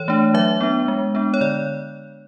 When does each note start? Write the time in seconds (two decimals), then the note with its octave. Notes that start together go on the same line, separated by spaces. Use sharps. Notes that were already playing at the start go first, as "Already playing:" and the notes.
Already playing: E3 C#5
0.08 A3 D4
0.34 F#3 E5
0.61 B3 D4
0.88 G#3
1.15 B3 D4
1.34 C#5
1.41 D3 D5